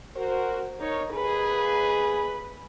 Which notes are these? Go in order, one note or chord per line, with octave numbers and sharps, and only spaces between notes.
F#4 A#4 C5
D#4 A#4 C#5
D#2 G#4 B4